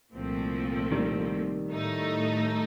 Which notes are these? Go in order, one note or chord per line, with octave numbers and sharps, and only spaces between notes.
C2 A#2 F3 A3 C4
D#3 G3
A2 A3 D#4